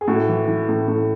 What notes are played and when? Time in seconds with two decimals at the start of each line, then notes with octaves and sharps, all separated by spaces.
0.01 G#4
0.08 A2 F#4
0.28 E3
0.47 E3
0.69 A2
0.88 A2